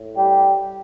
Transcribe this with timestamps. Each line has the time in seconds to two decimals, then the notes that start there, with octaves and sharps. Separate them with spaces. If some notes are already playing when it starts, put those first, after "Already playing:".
Already playing: A2
0.17 G3 G4